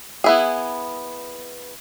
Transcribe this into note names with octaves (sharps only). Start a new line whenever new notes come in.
B3 E4 G#4